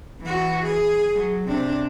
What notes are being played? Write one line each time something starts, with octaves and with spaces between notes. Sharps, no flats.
E3 F#4
G#4
F#3
C3 D4